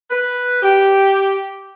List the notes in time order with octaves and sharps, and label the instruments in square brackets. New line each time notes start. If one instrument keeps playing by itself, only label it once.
[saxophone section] B4
G4